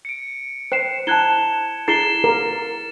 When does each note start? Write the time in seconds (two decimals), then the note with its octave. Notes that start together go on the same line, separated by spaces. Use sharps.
0.05 C#7 D7
0.72 C5 G5 C7 E7
1.07 E4 A5 F#6 G#6 E7 G7
1.88 E4 G#4 A6 C7 E7 G7
2.24 A#4